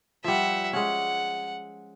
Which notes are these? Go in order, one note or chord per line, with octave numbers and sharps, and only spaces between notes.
F3 G3 E5 F#5
G#3 C#4 F#5